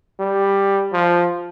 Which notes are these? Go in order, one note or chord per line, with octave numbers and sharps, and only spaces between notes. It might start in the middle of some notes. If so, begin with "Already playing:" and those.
G3
F3